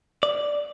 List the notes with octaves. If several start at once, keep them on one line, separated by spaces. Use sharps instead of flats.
D5